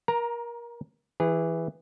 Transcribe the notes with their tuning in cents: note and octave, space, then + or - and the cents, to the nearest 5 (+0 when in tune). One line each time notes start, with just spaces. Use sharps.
A#4 +25 A#5 +0
E3 +0 G#4 -25